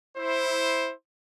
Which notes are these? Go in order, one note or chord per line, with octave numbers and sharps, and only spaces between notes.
E4 C5